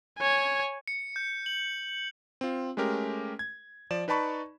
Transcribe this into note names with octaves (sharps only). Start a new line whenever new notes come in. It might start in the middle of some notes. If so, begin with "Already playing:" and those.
C#5 G#5
C#7
G6
F#7
C4 F4
G#3 A3 C#4 G4 A#4
G#6
F3 D5 E7
D#4 B4 D5 A5 B5 C#6